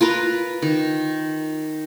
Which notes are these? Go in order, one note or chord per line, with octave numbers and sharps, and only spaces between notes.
F4 A#4 B4 F5
D#3